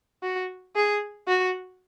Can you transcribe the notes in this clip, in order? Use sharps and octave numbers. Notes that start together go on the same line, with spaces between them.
F#4
G#4
F#4